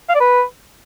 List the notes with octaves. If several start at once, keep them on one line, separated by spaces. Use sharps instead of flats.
F5
D5
B4